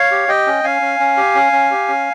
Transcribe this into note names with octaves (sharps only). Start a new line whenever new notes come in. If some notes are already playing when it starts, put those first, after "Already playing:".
Already playing: C#5 F5
G4
G4 D#5 G5
C#4
C#4 F5 G#5
C#4
C#4
G4
C#4
C#4
G4
C#4